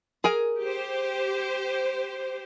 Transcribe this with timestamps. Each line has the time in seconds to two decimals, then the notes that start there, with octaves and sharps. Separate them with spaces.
0.24 G#4 A#4 G#5
0.61 G4 C5